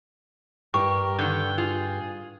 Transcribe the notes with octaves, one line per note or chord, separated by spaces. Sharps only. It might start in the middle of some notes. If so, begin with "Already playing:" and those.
G2 G4 A#4 C#6
D3 D#3 G5
F4 G#4